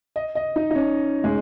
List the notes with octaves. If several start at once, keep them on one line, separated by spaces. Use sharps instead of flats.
D#5
D#5
D#4
D#4
C#4
G#3